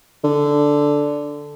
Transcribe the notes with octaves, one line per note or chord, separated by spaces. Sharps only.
D3